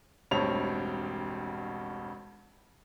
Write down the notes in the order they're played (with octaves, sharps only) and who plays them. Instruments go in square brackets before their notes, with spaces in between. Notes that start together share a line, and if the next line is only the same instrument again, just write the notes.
[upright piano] E1 A1 G2 C4 C#5 F7